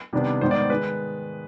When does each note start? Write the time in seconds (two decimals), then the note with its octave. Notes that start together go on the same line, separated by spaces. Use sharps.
0.13 C3 D#3 G3 B3 D4
0.41 G#2 D#3 G3 B3 C5
0.51 D5
0.61 C5
0.70 D#3 G#3 B4